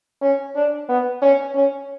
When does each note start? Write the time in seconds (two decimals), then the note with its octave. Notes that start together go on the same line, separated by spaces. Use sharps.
0.21 C#4
0.55 D4
0.88 B3
1.22 C#4
1.54 C#4